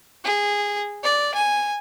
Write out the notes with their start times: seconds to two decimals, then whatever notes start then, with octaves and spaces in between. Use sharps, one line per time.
0.24 G#4
1.03 D5
1.34 G#5